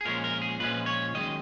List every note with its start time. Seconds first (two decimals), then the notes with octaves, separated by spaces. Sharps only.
0.01 G#4
0.05 A#2 F3 G#3 C#4 A#4
0.24 A#4
0.42 G#4
0.60 A#2 F3 G#3 C#4 B4
0.86 C#5
1.14 F#2 D#3 G#3 D#5